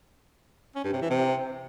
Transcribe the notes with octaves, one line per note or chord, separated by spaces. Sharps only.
C#4
G2
C3
E3
C3